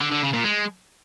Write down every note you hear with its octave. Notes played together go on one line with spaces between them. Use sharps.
D3
D3
C#3
A#2
G#3